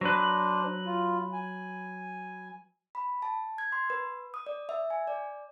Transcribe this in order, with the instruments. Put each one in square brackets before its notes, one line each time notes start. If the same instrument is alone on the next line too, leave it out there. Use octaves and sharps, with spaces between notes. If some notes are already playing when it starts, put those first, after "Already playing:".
[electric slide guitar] F#3 B4 [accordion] D4 C5
[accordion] F4
G#5
[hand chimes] B5
A5
G#6
C6
B4
D#6
D5
E5
G#5
D5